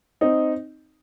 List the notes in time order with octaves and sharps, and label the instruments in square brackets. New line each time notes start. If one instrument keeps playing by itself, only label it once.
[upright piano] C4 D#4